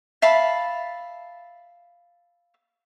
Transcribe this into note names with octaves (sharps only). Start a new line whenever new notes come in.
E5 F5 A5 B5